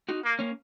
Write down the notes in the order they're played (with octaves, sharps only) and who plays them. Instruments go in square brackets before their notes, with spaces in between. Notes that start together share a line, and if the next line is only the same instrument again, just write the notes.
[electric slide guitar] D#4 F#4
[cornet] A#3
[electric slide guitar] A#3 C#4